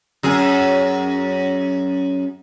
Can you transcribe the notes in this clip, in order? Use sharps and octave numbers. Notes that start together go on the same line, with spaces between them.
F#2 G#4